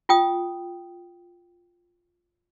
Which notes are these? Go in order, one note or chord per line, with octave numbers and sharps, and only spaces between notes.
F4 G5 D#6